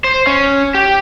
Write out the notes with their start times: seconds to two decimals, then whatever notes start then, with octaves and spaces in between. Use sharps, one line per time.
0.04 C5
0.27 C#4
0.74 G4